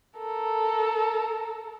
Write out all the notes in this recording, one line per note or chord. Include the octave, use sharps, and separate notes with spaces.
A4 A#4